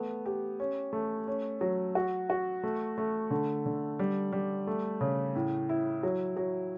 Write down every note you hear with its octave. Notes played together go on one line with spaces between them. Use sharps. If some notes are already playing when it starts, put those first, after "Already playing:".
Already playing: A3 B3
G4
C#4
A3
C#4
F#3
F#4
F#4
A3
A3
D3
D3
G3
G3
A3
C#3
A2
E4
F#3
F#3